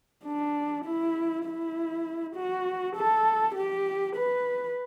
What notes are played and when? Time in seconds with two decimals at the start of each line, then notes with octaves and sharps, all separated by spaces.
0.25 D4
0.85 E4
1.45 E4
2.36 F#4
2.96 A4
3.55 G4
4.16 B4